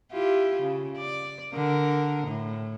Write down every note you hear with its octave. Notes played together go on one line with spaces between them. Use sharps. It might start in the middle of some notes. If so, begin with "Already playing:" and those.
E4 F4 G4
C#3
D5
D3 A#4
A2